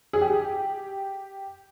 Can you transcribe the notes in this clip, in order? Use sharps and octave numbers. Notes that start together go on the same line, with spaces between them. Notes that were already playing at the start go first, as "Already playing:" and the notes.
G#4
G4